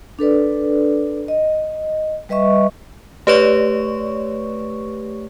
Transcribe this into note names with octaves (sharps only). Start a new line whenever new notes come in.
D4 A4 B4 D5
D#5
G3 B4 D#5 E5 C#6
A3 G4 B4 C#5 D5 C#6